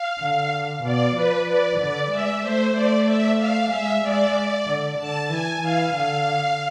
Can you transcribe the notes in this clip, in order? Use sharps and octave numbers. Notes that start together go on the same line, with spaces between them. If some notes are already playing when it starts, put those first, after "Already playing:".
Already playing: F5
D3
B2 D5
F3 B4
D5
D3 D5
G#3 E5
A3 C5
A3 D5
E5
F5
G#3 E5
G#3 D5
D3
D3 A5
E3 G#5
E3 F5
D3 F5